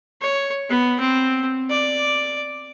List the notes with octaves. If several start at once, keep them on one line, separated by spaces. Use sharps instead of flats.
C#5
B3
C4
D5